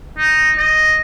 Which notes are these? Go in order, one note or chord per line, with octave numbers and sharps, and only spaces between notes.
D#4
D#5